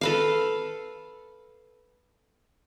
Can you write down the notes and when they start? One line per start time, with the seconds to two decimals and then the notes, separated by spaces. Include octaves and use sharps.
0.01 A4 B4 F5